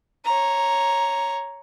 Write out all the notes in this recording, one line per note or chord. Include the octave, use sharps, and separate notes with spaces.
C#5 A#5